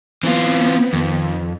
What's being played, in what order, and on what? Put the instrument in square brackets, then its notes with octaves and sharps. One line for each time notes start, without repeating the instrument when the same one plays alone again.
[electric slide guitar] E3 F4 [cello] B3 [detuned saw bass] C4
[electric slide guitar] F2 [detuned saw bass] D#3